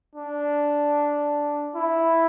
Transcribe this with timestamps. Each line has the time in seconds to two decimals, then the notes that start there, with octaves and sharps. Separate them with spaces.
0.15 D4
1.75 E4